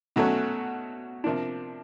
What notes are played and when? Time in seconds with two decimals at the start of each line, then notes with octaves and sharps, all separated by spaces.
0.16 B2 F#3 A3 C#4
1.24 C3 F3 A#3 D4